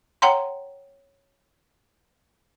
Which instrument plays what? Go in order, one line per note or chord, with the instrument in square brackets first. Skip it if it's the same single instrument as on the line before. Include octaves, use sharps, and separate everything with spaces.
[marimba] C#5 F#5 G5 A#5 C6